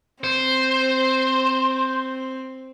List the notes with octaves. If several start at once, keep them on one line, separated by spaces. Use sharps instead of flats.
C4 C5